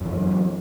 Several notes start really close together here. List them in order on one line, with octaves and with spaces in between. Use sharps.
F#2 E3 F#3